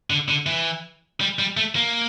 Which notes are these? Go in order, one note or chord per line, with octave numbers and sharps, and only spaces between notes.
D3
D3
E3
G3
G3
A3
A#3